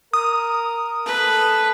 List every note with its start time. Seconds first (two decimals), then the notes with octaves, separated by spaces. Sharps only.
0.13 A#4 D#6
1.06 A4 B4